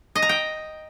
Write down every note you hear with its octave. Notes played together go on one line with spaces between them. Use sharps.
D#5
A#5
G5